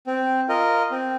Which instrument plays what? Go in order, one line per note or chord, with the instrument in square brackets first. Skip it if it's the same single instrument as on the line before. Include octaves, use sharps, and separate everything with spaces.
[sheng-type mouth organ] C4
F4 A#4 D#5
C4